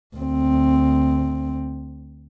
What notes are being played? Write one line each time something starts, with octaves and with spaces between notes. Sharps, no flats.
D2 C4